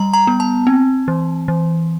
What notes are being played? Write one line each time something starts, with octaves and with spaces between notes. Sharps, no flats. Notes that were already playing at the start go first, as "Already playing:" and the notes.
Already playing: G3 A#5
A#5
B3
A5
C4
E3
E3